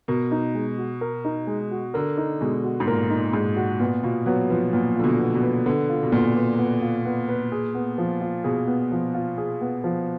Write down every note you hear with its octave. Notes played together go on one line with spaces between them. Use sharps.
B2 A#4
D#4
G#3
F#4
A#4
D#4
G#3
F#4
D3 A#4
D#4
B2 G#3
F#4
G#2
A#2 A#4
D#4
G#2 G#3
F#4
A#2 B3
B2 F4
F#3 B3
F3 B4
A#2 B3
D3 F4
B2
B3
B2
B4
D3 B3
F4
B2
A#2 B3
B4
B3
F4
B3
B4
G#4
B3
F3
F4
B2 G#4
B3
F3
F4
G#4
B3
F3